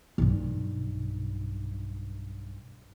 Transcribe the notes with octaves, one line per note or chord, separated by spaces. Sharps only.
B1 G2